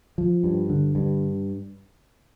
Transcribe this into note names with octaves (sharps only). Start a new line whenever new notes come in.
F3
G2
D3
G2